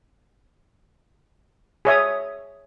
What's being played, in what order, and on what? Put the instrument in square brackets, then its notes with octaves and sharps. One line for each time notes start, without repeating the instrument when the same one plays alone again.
[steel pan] G#4 C#5 E5 D#6